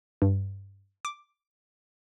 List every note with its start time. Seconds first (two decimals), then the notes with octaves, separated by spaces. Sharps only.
0.22 G2
1.05 D6